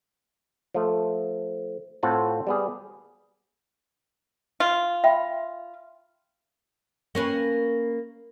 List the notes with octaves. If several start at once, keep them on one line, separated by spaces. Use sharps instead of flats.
F3 A3
A2 C4 F4 A4 F#5 A5
G3 B3 G#4
F4
E5 G5 B5
A#3 C#4 B4